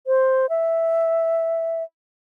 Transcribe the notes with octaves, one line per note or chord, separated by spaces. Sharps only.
C5
E5